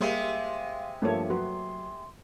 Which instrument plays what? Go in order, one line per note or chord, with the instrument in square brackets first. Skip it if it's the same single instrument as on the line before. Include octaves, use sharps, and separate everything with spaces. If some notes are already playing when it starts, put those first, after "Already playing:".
[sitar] C3 G#3 C5 [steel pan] G3 A#3 [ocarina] F5
[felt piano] G2 F3 [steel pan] A3 A#3 C#5 [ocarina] A5
[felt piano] F#3 [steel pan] F#4 B4 [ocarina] C6